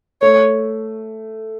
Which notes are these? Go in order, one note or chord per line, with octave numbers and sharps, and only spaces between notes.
A3 C#5